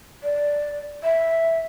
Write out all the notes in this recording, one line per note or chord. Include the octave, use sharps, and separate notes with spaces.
D5
E5